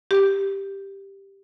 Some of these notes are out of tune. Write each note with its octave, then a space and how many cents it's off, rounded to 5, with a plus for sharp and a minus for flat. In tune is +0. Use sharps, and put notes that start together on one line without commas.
G4 +5